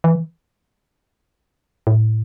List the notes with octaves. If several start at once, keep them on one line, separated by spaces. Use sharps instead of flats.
E3
A2